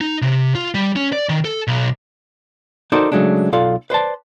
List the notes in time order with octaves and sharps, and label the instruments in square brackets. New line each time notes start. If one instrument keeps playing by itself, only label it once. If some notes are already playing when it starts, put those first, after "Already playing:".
[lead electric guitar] D#4
C3
F4
G3
C#4
D5
D#3
A4
B1
[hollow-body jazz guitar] D#4 F#4 A4 A#4 C5 D5
C#3 F#3 G#3 A3 D4
B1 F4 A4 D5 F5
B4 C5 D5 A5